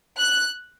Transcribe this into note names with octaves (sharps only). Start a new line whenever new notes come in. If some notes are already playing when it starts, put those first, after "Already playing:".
F#6